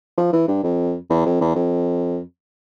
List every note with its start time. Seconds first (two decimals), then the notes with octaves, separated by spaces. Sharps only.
0.18 F3
0.33 E3
0.48 G2
0.63 F2
1.10 E2
1.26 F2
1.41 E2
1.56 F2